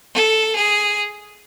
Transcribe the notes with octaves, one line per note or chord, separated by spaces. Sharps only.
A4
G#4